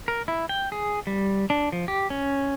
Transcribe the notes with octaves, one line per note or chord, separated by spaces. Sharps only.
A#4
E4
G5
G#4
G3
D4
F3
G4
C#4